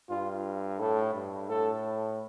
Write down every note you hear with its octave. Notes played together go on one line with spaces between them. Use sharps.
G2 F4
A2 A4
G2
A2 A4